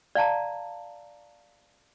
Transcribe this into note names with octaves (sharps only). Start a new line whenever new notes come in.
D5 F5 A5 A#5